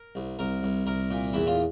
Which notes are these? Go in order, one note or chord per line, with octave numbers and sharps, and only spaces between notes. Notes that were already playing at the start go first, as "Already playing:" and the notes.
Already playing: A#4
C2
C2 A#4
C2
C2 A#4
A#2
E2 E4
F4